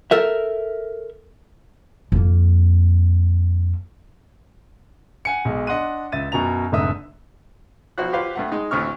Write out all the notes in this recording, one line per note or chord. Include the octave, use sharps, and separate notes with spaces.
A4 A#4 E5
F2 A#3
F#5 G#5 C#7
B1 G#3
D4 D#5 F#5 C6 F#6 D#7
C#2 E5 A6 D#7
F#2 B2 B3 A#5 F7
F1 G#2 D3 D#5 E5 D#6
B1 F3 F#4 C5 F#5 F#6
F4 G4 B4 C5 F5
G2 A3 F#5
G#3 D#4
A1 D2 A2 C4 C#6 F6